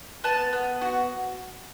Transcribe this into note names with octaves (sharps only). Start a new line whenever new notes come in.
B3 A5
B3
F#4